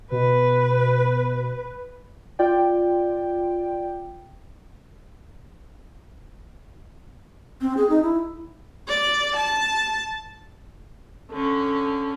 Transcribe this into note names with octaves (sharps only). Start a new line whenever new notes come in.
B2 B4
F4 D5 G5
C4
G#4
D#4
E4
D5
A5
D3 C#4